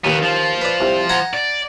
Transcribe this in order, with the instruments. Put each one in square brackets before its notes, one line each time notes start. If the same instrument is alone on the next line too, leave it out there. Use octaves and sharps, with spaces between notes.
[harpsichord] D#2 [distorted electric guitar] D#3 B3
[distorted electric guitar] F3
[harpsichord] B4 D5
C2
F#5 G#5 A#5
[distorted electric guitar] D5